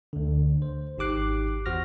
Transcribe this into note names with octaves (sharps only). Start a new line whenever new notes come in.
D2 D3
C5
G#1 D#4 G4 D6 F#6 C7
E2 F#4 C5 F6 A#6